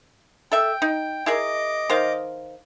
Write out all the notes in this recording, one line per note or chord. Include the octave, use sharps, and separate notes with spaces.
A4 E5 G5
D#4
E4 G#4 A#4 D#5 D6
D#3 C5 F5